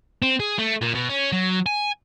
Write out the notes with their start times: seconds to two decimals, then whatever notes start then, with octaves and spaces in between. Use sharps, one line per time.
0.22 C4
0.40 G#4
0.59 A3
0.81 A#2
0.94 B2
1.09 C#4
1.32 F#3
1.66 G#5